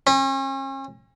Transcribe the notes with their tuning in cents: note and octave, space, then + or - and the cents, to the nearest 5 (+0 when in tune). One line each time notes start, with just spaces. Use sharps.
C#4 -40